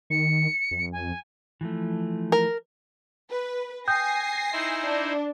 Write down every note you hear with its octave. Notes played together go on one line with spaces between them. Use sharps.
D#3 C#7
F2
G#5
E3 F3 A3
A#4
B4
G5 G#5 D#6 G6 A#6 C7
D#4 E4 C5
D4